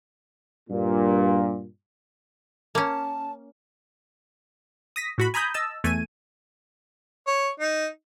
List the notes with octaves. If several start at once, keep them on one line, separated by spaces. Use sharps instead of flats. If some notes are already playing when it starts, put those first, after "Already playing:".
G2 A#2
A#3 C#4 A5
D#6 A#6 B6
A2 F#4 B5
G#5 A#5 B5 D#6 G6
D#5 A5 E6
E2 A3 G#5 D#7
C#5
D#4